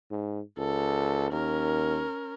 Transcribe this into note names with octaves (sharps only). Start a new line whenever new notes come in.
G#2
C#2 A4
D#2 C#4 A#4